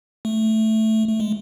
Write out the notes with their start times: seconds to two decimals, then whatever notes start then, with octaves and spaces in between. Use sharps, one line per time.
0.25 A3
1.08 A3
1.20 G#3